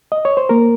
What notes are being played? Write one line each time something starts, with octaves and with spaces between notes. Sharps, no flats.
D#5
C#5
C5
A#3 A#4